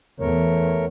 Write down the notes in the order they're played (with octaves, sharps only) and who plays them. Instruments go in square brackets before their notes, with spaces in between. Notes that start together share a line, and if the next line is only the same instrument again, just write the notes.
[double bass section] E2 [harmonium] A3 A#4 C#5